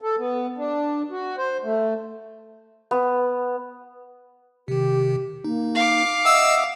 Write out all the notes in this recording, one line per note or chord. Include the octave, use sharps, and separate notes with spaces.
A4
B3
D4
F#4
C5
A3
B3
C3 D#3 G4
A#3 D#4
F5 D6
D#5 E5 F#5 D#6 E6